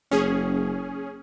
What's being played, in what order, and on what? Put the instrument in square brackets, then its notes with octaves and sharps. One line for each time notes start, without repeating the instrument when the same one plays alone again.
[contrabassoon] F#1 [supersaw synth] C#4 G#4